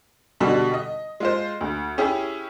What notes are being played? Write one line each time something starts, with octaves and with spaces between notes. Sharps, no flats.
B2 D3 G3
D#5
G#3 F4 C5
D2
C#4 E4 G4 G#4